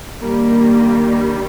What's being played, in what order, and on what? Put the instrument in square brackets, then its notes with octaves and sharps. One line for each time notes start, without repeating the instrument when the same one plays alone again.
[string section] G2 D#3 G3 A#3